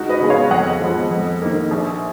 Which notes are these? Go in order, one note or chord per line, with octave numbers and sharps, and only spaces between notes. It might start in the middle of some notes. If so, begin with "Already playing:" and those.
Already playing: C#2 D#4 F#4
B4 D#5
C#3 G#3 B3
C#5 F5
F2 D#5 F#5
F3 G#3 B3
F2
D#3 A#3
A#1